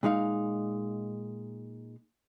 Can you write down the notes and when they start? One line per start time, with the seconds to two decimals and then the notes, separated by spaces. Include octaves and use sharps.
0.03 A#2 G#3 D#4 F5